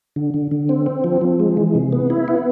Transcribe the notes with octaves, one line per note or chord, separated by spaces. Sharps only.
D3
D3
D3
C4
C4
F3
F3
G#3
E3
C3
B3
E4
B3